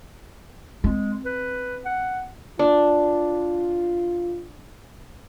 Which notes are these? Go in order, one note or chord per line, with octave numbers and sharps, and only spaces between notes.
G#3 C4
B4
F#5
D4 F4